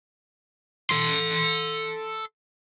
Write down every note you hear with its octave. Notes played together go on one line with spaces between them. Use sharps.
A4 C6